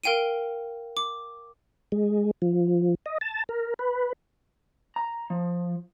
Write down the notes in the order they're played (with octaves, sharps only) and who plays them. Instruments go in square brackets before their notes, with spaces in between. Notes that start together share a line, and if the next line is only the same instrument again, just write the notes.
[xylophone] A#4 F5 G5 D7 D#7
D6
[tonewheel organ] G#3
F3
D#5
A5
A#4
B4
[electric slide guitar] A#5
F3